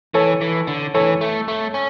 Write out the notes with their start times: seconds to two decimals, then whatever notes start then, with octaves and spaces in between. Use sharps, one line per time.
0.14 E3 A4 C#5
0.41 E3
0.67 D3
0.94 E3 A4 C#5
1.21 A3
1.48 A3
1.74 C#4